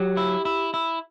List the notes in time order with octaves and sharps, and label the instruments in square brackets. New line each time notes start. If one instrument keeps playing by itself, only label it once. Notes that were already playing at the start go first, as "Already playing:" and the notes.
Already playing: [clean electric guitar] F#3 [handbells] G4
[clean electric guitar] E4
E4
E4